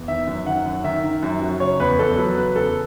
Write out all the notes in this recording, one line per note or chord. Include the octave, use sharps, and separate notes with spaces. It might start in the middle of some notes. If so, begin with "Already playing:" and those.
Already playing: E2
D#3 E5
F#2
D#3 F#5
F#2
D#3 E5
D#3
F#2
F#3
C#3 C#5
E2 B4
E2 A4
F#3 B4
C#3 B4
E2 A4